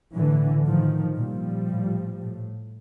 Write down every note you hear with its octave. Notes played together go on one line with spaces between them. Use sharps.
A2 D3 E3
A2 D#3 F3
A#2 F3 G3
A2
A2